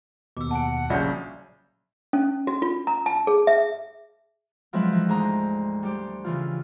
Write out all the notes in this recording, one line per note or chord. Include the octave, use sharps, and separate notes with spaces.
D#2 B2 D6 E6
F#5 G#5 A5
A#1 C#3 F#3 G3 F4 D5 E5 G6
C#4
F#4
F4
A#5
A5
G#4
E5
F3 F#3 G#3 C4 B4 E5
E3 D#4
D2 G#2 G#4 C5 A#5
G3 G4 C5
C#3 E3 F4